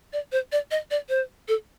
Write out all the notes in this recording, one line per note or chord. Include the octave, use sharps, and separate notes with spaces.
D5
C5
D5
D#5
D5
C5
A4